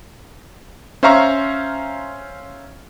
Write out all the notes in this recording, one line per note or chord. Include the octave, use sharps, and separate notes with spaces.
C#4 C5 E5 F5 A#5 C#6